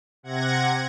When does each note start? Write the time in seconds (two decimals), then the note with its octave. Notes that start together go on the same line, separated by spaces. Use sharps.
0.23 C3 F#5 G#6 A#6